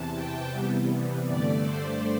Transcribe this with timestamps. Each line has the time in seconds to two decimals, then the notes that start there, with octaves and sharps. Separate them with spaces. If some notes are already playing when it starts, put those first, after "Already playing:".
Already playing: E2 C3 E3 A5
0.14 G5
0.52 C3 E3 G3 B3
1.27 G2 D3 A3 D5
1.65 C5